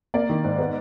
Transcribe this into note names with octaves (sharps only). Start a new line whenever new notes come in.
A#3 D5
D#3
G#2
B3